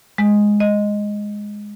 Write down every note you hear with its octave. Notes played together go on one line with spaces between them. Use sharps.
G#3
D#5